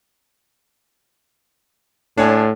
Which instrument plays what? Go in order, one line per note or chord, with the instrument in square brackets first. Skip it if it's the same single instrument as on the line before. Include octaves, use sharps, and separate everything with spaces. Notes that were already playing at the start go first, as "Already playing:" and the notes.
[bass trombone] A2 [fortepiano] D4 C#5 G#5